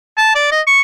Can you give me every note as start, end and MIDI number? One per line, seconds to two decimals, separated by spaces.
0.18 0.32 81
0.35 0.49 74
0.52 0.61 75
0.67 0.81 85